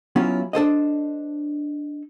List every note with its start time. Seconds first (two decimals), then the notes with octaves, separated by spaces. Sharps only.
0.16 F#3 B3 C#4 E4 F4
0.53 D4 A4 C5 D#5